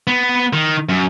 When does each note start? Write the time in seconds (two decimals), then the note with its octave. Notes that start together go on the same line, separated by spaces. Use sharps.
0.07 B3
0.53 D#3
0.89 F#2